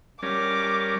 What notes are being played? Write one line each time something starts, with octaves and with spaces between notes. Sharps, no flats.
G3 C#4 A#4 D6